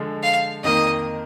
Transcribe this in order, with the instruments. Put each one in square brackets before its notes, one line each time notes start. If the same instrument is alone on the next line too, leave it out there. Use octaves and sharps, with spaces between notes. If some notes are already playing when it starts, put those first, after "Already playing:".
Already playing: [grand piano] D3 F3 G#3
[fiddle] F5
[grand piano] F2 D#3 A#3 [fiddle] D#5